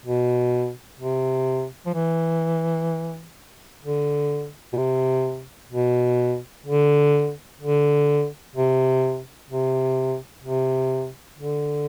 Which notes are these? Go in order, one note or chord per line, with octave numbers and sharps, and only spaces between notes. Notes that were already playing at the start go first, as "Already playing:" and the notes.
B2
C3
F3
E3
D3
B2
C3
B2
D3
D3
C3
C3
C3
D3